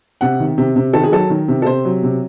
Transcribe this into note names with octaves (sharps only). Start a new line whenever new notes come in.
C3 F#5
D#3
C3
C3
D#3 A4
G#4
F#3 A4
D#3
C3
A4
C3 C5
F#3
C3